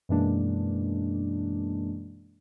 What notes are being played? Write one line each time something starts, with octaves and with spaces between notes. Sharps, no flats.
F#2 B2 E3 G#3 A#3 D4